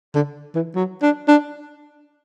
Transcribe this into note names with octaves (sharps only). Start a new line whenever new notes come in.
D3
E3
F#3
D4
D4